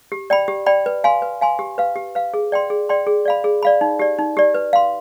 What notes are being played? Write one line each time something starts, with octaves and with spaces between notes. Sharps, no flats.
G4
D5 G5 B5
G4
D5 G5 B5
B4
F5 G#5 C6
B4
F5 G#5 C6
G4
B4 F5
G4
B4 F5
G#4
D5 G5 C6
G#4
D5 G5 C6
G#4
D5 F5 B5
G#4
D5 F5 B5
D#4
G4 D5
D#4
G4 D5
B4
F5 C6